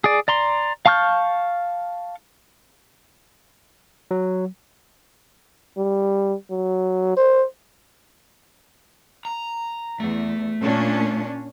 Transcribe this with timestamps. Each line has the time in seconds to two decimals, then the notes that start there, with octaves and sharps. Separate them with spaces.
0.04 G#4 D5
0.28 D5 A#5 C6
0.86 F5 A5 C#6 F6 G6
4.11 F#3
5.77 G3
6.50 F#3
7.17 C5
9.25 A#5
10.00 E2 A3
10.60 A#2 C#4 D4